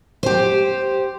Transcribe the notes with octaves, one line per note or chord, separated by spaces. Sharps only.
G4 C5